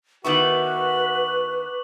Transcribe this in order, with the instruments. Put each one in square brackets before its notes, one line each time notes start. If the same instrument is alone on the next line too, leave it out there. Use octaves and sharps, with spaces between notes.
[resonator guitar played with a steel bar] D#3 B3 E4 [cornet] F#4 [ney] B4 [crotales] C#6 D6 F#7